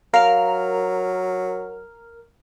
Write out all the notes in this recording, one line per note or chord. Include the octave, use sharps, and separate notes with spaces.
F#3 A#4 F5 F6